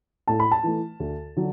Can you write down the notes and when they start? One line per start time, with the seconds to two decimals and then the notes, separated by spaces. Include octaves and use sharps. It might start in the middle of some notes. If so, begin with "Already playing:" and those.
0.28 A2 A5
0.40 B5
0.51 A5
0.63 E3 A3
1.00 D2
1.37 D3 F#3